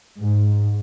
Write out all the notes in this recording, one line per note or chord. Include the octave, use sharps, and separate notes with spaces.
G#2